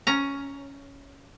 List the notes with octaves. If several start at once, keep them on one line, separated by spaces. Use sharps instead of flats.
C#4 A#5